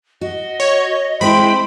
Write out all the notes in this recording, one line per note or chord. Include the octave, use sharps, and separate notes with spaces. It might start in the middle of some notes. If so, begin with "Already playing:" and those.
F#4 D#5
C#5
G#3 C4 E4 C5 G5 B5